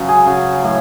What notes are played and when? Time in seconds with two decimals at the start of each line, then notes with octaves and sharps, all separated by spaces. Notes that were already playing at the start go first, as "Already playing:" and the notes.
Already playing: C#3 F#3
0.08 G#4
0.26 C#3 F#3
0.63 A2 F#3